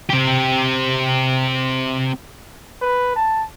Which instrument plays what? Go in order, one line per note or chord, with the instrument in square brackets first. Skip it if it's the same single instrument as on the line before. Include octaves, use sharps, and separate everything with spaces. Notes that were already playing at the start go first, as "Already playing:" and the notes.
[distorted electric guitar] C4 G4
[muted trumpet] B4
A5